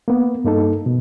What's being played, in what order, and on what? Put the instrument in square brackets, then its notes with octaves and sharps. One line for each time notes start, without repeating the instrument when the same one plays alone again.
[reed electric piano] A#3 B3
G2 A#3 D#4 A4
B2